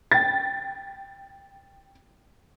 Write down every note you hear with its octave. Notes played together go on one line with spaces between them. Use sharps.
G5 A6